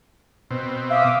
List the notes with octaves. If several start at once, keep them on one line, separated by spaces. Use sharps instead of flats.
B2 C4
E5 F5 D6 D#6